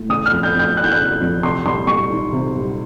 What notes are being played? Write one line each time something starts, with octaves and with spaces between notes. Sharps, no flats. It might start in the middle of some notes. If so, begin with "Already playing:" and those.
Already playing: A2
C#3 D#6
F6
F2
G6
F2
G6
E3 F#6
G6
F#6
C#3
F2
C3 C6
C2 C6
G3 C#6
D#3
C3
C2